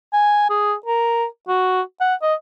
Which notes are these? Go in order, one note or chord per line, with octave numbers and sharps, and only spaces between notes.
G#5
G#4
A#4
F#4
F#5
D#5